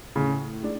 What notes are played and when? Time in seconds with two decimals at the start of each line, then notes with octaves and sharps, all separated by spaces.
0.16 A2 C#3
0.63 G#3 D4